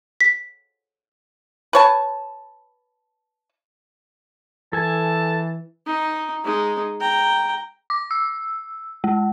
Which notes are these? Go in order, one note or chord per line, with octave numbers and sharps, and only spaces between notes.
B6
B4 C#5 A5
E3 A4 G#5 A5
D#4
G#3 D#4
G5 A#5
D6
E6
G#3